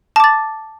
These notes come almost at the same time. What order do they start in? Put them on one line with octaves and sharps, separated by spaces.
A5 D6 A6